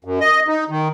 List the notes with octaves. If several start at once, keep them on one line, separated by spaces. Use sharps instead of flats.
F#2
D#5
D#4
D#3